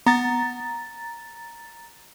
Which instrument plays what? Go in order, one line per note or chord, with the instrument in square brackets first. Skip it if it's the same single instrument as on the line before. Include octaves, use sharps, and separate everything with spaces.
[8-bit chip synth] B3 [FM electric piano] A#5 A6